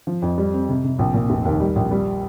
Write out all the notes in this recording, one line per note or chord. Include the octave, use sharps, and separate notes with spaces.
F3
F2
G3
C4
C3
C3
A#1
A#2
F1
D#2
G3
A#1
G3